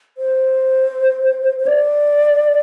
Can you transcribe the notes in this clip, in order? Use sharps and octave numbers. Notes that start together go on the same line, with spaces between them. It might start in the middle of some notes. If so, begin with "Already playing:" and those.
C5
C5
D5